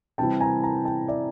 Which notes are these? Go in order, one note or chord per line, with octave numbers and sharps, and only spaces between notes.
C3 E3 G3 C4 E4 G5 A5
G#5 A#5
G#5 A#5
G5 A5
D5 E5